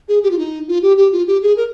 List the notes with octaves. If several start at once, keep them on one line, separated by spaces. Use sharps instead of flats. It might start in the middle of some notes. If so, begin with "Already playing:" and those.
G#4
G4
F4
D#4
F4
G4
G4
F4
G4
G#4
A#4